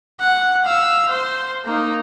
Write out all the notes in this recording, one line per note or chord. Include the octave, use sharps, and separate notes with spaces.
F#5
F5 E6
C5 C6
A#3 D#4